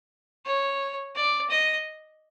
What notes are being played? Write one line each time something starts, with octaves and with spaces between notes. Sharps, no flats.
C#5
D5
D#5